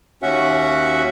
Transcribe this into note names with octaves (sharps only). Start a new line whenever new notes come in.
D#2 C#4 F#4 E5 F#5